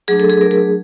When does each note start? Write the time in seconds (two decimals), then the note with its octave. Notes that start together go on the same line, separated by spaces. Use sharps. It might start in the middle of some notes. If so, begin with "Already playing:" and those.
0.08 F#3 A3 D4 G#4
0.20 A4
0.30 G#4
0.41 A#4
0.51 G#4